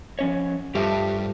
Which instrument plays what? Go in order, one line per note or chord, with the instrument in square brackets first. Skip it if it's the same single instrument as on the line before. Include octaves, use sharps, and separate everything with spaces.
[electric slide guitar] F3 C#4 C#5
[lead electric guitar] G2 [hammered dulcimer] F3 A3 [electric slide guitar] G4